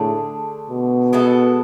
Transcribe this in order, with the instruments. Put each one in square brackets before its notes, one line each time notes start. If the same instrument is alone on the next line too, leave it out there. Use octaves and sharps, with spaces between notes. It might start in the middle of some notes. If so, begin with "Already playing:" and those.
Already playing: [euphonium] A2 [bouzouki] D3 A3 D4 G#4
[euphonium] B2
[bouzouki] G#3 B3 E4 A4